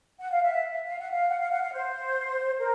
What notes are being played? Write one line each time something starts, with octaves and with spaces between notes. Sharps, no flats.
F#5
F5
E5
F5
F#5
F5
F#5
F5
F#5
F5
C5
A#4